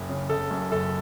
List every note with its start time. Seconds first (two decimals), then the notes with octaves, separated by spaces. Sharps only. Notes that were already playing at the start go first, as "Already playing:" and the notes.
Already playing: F#1
0.09 C#3
0.29 F#1 A4
0.50 F#2
0.71 F#1 A4